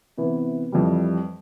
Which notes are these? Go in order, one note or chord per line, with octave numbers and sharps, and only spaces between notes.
C3 E3 B3
F2 E3 G3